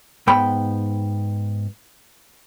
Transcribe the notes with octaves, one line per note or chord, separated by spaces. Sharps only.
G#2 B3 G5 B5